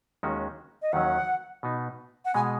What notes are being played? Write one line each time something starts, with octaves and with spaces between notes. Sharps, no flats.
D#2 D#3 G#3 C#4 F#4
D#5
D#2 D#3 F#3 C#4 F#5
B2 B3 D#4
F#5
B2 G#3 G#5